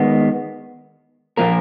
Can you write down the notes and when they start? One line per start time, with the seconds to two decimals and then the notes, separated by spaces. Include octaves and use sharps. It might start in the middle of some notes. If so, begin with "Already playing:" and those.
Already playing: D#3 G#3 B3
1.37 A#2 F3 A#3 A#4